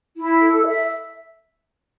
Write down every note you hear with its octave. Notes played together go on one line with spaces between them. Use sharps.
E4
A4
E5